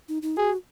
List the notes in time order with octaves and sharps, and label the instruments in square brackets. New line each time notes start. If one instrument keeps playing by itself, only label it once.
[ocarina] D#4
D#4
[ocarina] F#4 [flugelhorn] G#4